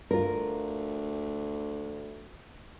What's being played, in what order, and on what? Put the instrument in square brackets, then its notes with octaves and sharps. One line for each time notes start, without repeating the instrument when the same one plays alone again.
[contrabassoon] D2 [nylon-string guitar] F4 A#4